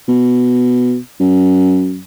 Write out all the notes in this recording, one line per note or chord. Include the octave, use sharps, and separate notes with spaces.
B2
F#2